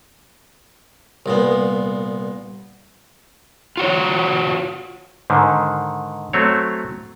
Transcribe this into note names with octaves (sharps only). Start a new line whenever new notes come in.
C2 A#2 B3
F4 F#4 C#5
G#2 D3 D#3
F#3 A3 C4 C#5